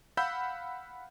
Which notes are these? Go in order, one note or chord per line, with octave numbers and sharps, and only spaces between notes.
F5 F#5 B5 E6 G6